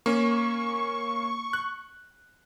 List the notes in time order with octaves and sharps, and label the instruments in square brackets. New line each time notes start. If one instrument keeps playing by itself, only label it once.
[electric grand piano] A#3 C#4 [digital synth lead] C#6
[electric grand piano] F#6